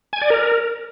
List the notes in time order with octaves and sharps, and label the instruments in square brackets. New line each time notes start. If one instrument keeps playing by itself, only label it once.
[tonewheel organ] G#5
D5
A#4